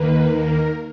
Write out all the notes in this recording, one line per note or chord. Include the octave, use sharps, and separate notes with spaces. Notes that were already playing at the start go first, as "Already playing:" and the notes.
Already playing: D#2 D#3 A#3 B4
A#4